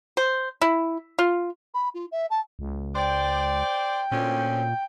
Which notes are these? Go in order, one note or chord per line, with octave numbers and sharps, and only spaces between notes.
C5
E4
F4
B5
F4
E5
A5
C#2
C5 D5 G5
D2 A#2 C4 C#4